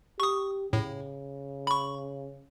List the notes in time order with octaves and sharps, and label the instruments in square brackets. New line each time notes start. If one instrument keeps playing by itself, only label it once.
[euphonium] G4 [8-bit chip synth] C#6 D#6
[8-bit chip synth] A2 [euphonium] C#3
[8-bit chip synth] B5 C#6